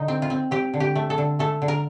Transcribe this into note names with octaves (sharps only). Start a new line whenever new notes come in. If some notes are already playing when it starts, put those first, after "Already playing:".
Already playing: D3 D#4
C4
F4
C4
C4 G4
D3
G4
A3
A4
D3
A3 A4
D3
A#4